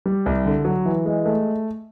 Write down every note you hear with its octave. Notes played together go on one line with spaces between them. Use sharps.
G3
C2
D3
F#3
E3
G#3
A3